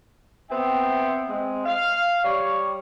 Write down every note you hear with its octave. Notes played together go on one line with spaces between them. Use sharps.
B3 C4 E5 G5
G#3 C4
F5
G3 C#5